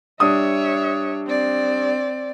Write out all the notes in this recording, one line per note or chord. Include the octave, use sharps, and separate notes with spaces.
G3 D4 C#5 E5 D#6
C4 D5